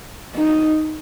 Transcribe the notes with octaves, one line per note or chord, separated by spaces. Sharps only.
D#4